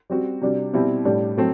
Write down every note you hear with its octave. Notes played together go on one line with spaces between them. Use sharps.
G3 C4 F#4
C3 G3 D4 F#4
B2 G3 C4 E4
A2 G3 D4
F#3 A3 C4